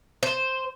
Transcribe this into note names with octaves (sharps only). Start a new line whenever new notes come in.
C5